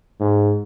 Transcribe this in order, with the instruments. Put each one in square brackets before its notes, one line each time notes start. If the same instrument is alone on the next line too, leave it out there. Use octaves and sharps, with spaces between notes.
[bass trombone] G#2